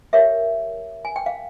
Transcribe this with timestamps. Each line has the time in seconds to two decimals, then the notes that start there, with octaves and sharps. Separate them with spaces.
0.13 G4 A#4 C#5 E5
1.05 G#5
1.16 G5
1.26 F5